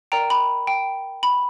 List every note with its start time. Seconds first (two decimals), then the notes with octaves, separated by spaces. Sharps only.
0.12 A#4 D5 G5 A#5
0.30 B5
0.67 G5
1.23 B5